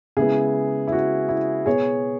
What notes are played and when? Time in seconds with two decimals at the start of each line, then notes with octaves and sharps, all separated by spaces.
0.17 C#3 G#3 B3 E4 G#4
0.88 E4
0.92 F#4
1.29 E4
1.66 B2 B3 G#4 C#5